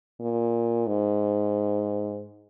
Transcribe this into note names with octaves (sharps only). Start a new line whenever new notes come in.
A#2
G#2